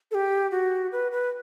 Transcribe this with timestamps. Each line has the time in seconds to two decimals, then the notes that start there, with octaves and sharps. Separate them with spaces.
0.11 A4
0.15 G4
0.51 F#4
0.92 B4
1.12 B4